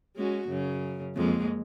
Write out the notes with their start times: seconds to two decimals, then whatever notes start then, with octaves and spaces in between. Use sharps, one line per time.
0.16 G#3 C#4 F#4
0.48 F#2 C#3
1.15 F2 G#3 A#3